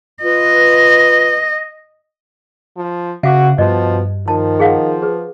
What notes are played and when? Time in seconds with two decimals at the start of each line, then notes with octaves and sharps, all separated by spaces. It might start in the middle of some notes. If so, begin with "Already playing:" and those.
0.23 F4 B4 D#5
2.77 F3
3.23 C#3 F#4 E5 F5 D6
3.58 G2 B2 F3 D#5
4.28 D#3 F3 A5
4.60 G#4 F5 F#5
5.02 G#4 B4